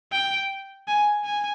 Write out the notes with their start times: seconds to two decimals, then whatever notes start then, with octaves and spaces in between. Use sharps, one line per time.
0.12 G5
0.88 G#5
1.24 G#5